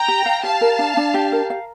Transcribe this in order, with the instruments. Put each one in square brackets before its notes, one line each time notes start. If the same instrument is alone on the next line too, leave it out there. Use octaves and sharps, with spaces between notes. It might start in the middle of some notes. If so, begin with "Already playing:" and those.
Already playing: [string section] G5 A#5
[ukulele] G4
F5
[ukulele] G4 [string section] F5 A5
[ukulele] A#4
D4
D4
G4
A#4
F5